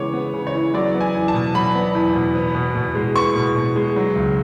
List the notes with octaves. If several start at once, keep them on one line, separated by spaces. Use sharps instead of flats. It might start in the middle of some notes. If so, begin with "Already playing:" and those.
Already playing: C#3 E3 G#3 B3 C#5 D6
B3
C#3
C#5
E3
F#3 D5
B3
G#5
E2
A5
B2
F#3 B5
B3
E2
B2
B3
B2
B2
G#3
B3 C#6
B2
B2
G#3
F#3
C#2